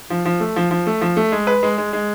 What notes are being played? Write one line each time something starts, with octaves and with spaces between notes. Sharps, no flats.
F3
F3
A3
F3
F3
A3
F3
A3
G#3
B4
G#3
G#3
G#3